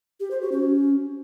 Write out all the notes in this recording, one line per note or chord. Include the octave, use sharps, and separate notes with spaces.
G4
C5
F#4
C#4